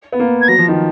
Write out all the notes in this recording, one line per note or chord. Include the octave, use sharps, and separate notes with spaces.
B3
A#3
G#6
F#3 A#6
F3
D#3